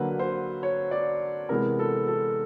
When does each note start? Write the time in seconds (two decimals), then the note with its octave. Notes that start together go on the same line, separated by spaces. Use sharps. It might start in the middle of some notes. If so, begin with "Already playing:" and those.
Already playing: D3 F#3 A#3 B4
0.19 C5
0.63 C#5
0.91 D5
1.49 C3 E3 G#3 B3 A#4
1.79 A4
2.07 A4